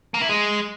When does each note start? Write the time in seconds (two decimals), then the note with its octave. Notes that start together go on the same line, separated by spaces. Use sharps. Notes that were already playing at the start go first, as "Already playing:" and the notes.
0.14 A#3
0.22 E4
0.29 G#3